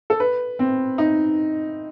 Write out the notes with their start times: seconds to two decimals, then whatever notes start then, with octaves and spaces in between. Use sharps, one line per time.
0.10 A4
0.20 B4
0.59 C4
0.98 D#4